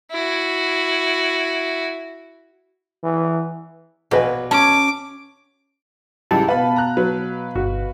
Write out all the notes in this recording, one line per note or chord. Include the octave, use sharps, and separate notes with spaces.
E4 F#4
E3
A#1 B2 B4 G#5
C#4 A5 D6
C#2 E3 G3 E4 A5
B2 B4 F5 B5
A#5 F#6
F#3 B4
G1 F#4